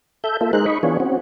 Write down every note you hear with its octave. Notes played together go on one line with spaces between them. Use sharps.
A4 E5 G6
A#3 F4 A4 E5
G#3 D#4 G#4 A#4 C5 F#6
D#4 D#5 B5 C#6
E3 B3 D4 F4 G#4 C#5
C4 C#4 F#4